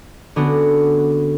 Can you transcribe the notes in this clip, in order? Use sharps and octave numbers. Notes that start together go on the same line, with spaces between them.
D3 B3 C#4 D4 F#4